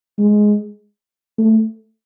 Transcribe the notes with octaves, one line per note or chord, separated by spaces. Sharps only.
G#3
A3